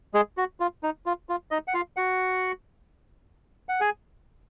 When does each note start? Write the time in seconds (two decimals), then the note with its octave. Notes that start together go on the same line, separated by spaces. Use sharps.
0.14 G#3 G#4
0.37 F#4
0.60 F4
0.83 D#4
1.06 F4
1.29 F4
1.51 D#4 D#5
1.68 F#5
1.74 F4 F5
1.97 F#4 F#5
3.69 F#5
3.80 G#4 G#5